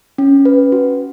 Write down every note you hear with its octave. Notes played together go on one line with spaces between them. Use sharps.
C#4
B4
F#4